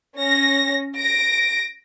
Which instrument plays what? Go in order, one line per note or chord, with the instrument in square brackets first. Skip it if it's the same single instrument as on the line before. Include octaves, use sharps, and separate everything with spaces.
[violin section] C#4 A#6
A#6 D7